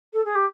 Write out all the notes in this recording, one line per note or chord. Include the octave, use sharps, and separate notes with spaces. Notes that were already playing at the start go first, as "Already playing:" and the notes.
A4
G#4
G4